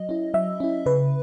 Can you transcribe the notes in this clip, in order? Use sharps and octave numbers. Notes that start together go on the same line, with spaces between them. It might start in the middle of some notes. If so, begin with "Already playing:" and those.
Already playing: F#3 D#5
C#4 E4
F#3 E5
C#4 E4
C#3 B4